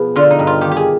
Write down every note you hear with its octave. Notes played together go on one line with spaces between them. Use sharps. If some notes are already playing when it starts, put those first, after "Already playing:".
Already playing: B2 F3 B3 G#4
D3 F4
D#4
G2
F4
D#3 G4
G4
G#4